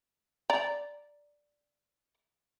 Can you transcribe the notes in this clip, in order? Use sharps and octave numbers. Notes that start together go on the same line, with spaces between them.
D5 A#5